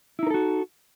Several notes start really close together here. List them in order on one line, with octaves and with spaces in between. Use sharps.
E4 D#4 A#4 A4 F#4